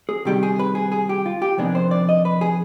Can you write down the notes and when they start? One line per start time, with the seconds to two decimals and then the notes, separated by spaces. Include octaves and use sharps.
0.09 G#4
0.25 C3 D#3 G3 G4
0.43 G#4
0.59 B4
0.75 G#4
0.92 G#4
1.09 G4
1.26 F4
1.42 G4
1.58 F2 C3 D#3 B3 D4 G#4
1.75 C5
1.91 D5
2.09 D#5
2.25 B4
2.41 G#4